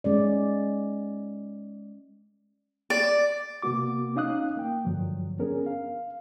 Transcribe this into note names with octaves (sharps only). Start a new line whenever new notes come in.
G#3 C#4 D5
D5
C3 A#3 B3 F#4 D6
C#4 D#4 F5 D#6 F#6
A#3 G5
G2 D3 F3 F#3
B3 C#4 D4 G#4 A#4
F5